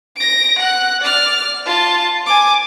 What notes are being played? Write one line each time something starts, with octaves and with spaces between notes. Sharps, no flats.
A#6 D7
F#5 F#6
D5 F6
F4 A5
G#5 D6